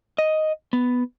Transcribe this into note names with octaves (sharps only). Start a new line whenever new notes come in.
D#5
B3